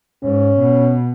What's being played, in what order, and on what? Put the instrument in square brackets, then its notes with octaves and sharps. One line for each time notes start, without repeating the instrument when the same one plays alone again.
[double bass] G#2 [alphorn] C#4
[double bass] B2